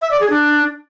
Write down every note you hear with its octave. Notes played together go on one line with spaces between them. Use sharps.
E5
D5
G#4
D4